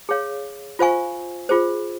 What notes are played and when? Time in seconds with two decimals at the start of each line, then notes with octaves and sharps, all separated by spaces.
0.09 G#4 C#5 F5
0.79 F4 C5 F5 G#5 C#6
1.49 F4 G#4 C5